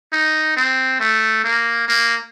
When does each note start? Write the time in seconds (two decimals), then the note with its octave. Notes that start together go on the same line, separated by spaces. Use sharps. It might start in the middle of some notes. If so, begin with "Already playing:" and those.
0.13 D#4
0.57 C4
1.00 A3
1.44 A#3
1.88 A#3